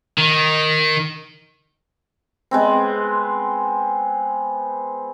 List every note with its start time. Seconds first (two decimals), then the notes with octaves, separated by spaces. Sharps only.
0.18 D#3
2.51 G#3 B3 C4